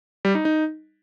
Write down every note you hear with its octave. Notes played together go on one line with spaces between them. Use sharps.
G3
D#4
D#4